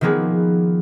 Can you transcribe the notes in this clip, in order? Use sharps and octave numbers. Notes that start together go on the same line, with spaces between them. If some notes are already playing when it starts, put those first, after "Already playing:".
D#3 F3 A#3 B3 G#4 B4